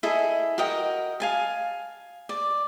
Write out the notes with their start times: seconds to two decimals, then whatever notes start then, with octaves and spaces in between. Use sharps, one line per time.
0.03 E4 G#4 A4 D#5
0.58 F#4 A#4 D#5 G5
1.20 F5 G#5 A5
2.29 D5